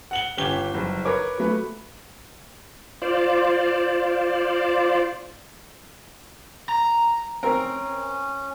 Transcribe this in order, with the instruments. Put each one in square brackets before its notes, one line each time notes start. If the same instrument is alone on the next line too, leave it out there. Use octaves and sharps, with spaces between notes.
[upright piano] F#5 F#7 G7
G1 C#4 G4 G7
F#1 G2
A#4 B4 C#5 D6
F#3 A3 B4
[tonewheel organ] F4 C5 D5
[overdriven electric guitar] A#5
[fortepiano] C4 A#4 [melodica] C#4